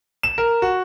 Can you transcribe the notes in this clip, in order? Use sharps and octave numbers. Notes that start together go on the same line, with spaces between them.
E7
A#4
F#4